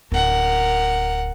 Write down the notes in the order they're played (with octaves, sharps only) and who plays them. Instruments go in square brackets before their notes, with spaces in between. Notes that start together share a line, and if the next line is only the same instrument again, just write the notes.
[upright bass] D1 [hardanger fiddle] A#4 F#5